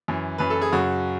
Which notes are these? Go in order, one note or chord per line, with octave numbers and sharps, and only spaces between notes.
F#2 E3
F#2 E3 B4
A4
G#4
F#2 C#3 F#3 F#4